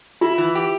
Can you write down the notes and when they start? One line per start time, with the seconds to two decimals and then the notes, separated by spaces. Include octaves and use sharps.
0.21 E4 F4
0.38 E3
0.55 G4